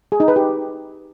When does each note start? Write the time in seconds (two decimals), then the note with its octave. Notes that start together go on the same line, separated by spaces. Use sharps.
0.12 G#4
0.20 D#4
0.28 B4
0.36 G4